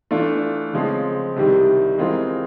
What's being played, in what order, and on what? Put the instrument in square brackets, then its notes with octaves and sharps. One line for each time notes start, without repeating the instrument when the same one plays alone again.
[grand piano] E3 A3 D4 F4
C#3 F3 G#3 C4
C2 C3 D#3 G3
E3 G#3 C4 F4 A#4